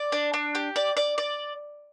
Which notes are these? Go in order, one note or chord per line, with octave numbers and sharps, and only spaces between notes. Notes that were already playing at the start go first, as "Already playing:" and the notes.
Already playing: D5
D4
D4
G4
D5
D5
D5